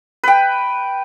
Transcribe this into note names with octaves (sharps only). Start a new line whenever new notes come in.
B4 G5